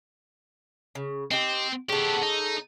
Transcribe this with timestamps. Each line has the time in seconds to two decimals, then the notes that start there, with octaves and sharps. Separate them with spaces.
0.95 C#3
1.31 C4 D#4 G4
1.89 C#3 B3 G4 A4
2.22 D#4